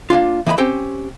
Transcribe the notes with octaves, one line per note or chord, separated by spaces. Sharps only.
A#3 C#4 D4 F4
E3 A#3 D#5 G5 B5
C4 C#4 G4 C5 G5